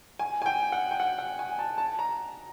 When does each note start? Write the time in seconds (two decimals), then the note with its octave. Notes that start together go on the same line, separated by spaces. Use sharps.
0.19 G#5
0.42 G#5
0.46 G5
0.72 F#5
0.91 G5
1.00 F#5
1.18 F#5
1.39 G#5
1.59 A5
1.78 A5
1.99 A#5